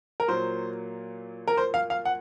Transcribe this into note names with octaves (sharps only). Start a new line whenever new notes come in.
A#4
A#2 F#3 A#3 C5
A#4
C5
F5
F5
F#5